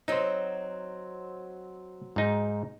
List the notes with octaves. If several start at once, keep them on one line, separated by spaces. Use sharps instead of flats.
F#3 C4 D#4 C5
G#2 D#4